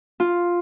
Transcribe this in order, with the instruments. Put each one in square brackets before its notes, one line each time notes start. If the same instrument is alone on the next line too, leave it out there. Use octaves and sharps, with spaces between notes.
[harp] F4